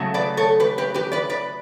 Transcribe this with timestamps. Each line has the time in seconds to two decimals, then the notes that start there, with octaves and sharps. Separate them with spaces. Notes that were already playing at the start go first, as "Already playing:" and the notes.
Already playing: C#3 F#3 A3
0.14 B4 D5
0.37 A4 C#5
0.60 G4 B4
0.78 G4 B4
0.94 G4 B4
1.12 B4 D5
1.29 B4 D5